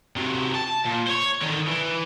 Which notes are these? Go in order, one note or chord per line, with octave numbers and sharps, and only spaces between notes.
C3 F#3
A5
A#2
C5 C#5
D3 D#3
E3